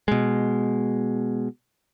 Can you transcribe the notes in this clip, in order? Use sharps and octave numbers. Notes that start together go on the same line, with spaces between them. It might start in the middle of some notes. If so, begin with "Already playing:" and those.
B2 G#3